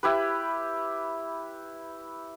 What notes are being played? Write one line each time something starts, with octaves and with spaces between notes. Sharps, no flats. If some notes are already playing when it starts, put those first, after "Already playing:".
E4 G4 B4